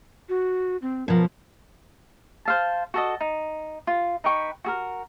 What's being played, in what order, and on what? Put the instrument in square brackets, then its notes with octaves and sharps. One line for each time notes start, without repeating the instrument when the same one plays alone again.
[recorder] F#4
C4
[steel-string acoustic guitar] B2 F3 [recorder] A#4
[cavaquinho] C5 F5 A5
F#4 A4 D#5
D#4
F4
D#4 B4 G5 C#6
F#4 G#4 A#4